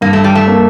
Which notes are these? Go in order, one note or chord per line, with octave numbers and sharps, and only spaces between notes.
G2 A#3
A3
G3
A3
A#3